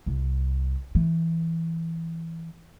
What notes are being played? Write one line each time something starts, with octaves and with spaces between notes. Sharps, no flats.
C2
E3